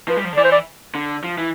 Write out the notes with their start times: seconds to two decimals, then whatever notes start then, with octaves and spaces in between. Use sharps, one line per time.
0.08 F3 B4
0.17 G3
0.24 F3
0.33 D3
0.37 E3 D5
0.45 C5
0.52 D5
0.95 D3
1.24 F3
1.38 E3